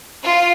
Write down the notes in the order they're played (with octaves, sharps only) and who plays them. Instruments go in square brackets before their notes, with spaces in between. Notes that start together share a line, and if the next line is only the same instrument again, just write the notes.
[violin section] F4